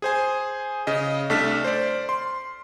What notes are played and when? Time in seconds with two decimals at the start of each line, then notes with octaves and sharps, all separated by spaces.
0.02 G#4 C5 G#5
0.87 C#3 D#5
1.30 C2 A3 D4 A4 F6 B6
1.64 C5 D5
2.09 C6